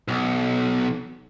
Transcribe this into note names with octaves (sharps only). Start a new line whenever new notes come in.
B1